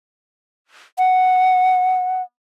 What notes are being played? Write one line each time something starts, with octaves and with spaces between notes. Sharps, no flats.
F#5